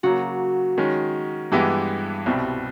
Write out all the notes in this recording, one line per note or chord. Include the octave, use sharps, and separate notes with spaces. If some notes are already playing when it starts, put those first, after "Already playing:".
C#3 F#3 A#3 F#4
D#3 G#3 C#4
G2 E3 G#3 B3 E4 G4
C2 B2 G3 C4